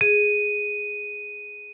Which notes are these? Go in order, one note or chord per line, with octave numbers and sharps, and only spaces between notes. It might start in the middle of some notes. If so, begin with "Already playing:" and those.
G#4 D#7